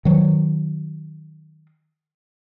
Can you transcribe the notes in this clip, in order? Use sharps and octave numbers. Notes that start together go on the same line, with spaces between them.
D#3 F#3